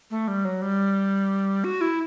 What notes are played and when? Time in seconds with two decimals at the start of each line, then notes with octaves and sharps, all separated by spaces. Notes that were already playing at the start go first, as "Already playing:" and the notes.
0.11 A3
0.28 G3
0.45 F#3
0.62 G3
1.64 F#4
1.81 E4